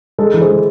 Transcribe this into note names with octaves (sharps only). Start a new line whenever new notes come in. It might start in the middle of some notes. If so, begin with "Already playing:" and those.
G#3 A4
E3
G#4 C5
G#3